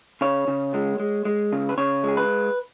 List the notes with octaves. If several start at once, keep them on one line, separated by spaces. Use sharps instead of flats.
C#3 C#5
C#3
G#3
G#3
G#3
C#3
B4
C#3 C#5
G#3 G#4
B4